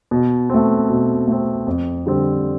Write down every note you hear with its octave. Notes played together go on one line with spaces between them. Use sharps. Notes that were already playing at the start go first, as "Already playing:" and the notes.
B2
A3 C4
B2
A3 C4
F2
D3 G3 C4